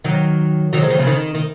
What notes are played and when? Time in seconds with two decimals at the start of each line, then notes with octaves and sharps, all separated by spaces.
0.04 D#3 F#3
0.73 D#3 F#3
0.81 F3 G#3
0.90 D#3 F#3
0.99 C#3 F3
1.07 D#3
1.35 D#3